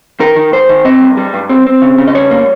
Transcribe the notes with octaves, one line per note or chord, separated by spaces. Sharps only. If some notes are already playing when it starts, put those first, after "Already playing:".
D#3 A#4
D#3
G#2 C5
D#3
C4 D#5
G2
G3
G2
C4
C4
C#3
C#3
D#5
G3 C#5
A#3